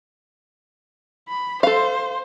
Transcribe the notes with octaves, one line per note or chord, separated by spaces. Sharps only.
B5
A4 C5 F5